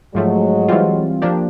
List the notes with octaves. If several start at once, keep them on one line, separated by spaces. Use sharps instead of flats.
G#2 F3 F#3 G#3 A3
E3 G3 C4 F4
F3 A#3 D4 G4